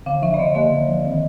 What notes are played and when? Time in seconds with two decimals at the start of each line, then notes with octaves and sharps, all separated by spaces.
0.06 D3 F5
0.22 F3 E5
0.34 D5
0.39 D3 D#5
0.55 A#3 D#5
0.72 D3
0.89 F3
1.05 D#3